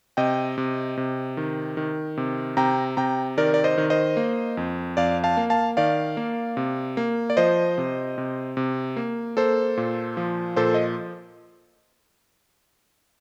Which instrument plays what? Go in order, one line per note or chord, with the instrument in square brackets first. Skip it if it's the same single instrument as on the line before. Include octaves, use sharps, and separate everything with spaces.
[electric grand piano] C3 D#5 G5
C3
C3
D#3
D#3
C3
C3 G5 A#5
C3 G5 A#5
D#3 A#4 D5
D5
C5 D#5
D#3
C5 D#5
A#3
F2
F2 D5 F5
F5 A5
A#3
F5 A5
D#3 D5 F5
A#3
C3
A#3
D5
F3 C5 D#5
C3
C3
C3
A#3
A#3 A4 C5
A#2
F3
A#2 A4 C5
D#5